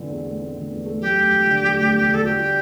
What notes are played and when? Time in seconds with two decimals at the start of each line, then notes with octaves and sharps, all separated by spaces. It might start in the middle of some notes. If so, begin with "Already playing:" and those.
Already playing: D3 E3 C4
0.09 E2
0.24 A3
0.40 C4
0.55 D3
0.70 E2
0.86 A3
1.01 F#3 G4
1.17 D2
1.31 E1
1.47 D3
1.62 F#3
1.78 D2
1.93 E1
2.09 D3
2.14 A4
2.24 F#4 G4
2.39 G3